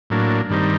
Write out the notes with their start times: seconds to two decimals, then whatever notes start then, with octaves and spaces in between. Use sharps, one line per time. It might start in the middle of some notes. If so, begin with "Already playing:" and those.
0.10 A2 F#3 A#3 D4
0.50 G2 D#3 G3 C4 D#4